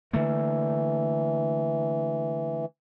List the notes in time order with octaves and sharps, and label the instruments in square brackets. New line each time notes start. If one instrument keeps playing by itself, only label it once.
[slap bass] D3 A3 A#3 [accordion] E3